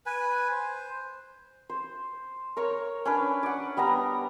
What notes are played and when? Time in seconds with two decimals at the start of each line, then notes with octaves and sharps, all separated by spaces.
0.06 B4 G#5
0.51 C5
1.69 C5
2.57 A#4 C#5 C#6
3.05 C#4 D4 B4
3.43 D5 F#5
3.77 G3 B3 D4 A#5